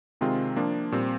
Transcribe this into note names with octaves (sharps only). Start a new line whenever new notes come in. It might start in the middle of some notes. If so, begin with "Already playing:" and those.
C3 D#3 G#3 C4 F4
F3 A#3 D4
A#2 G3 C4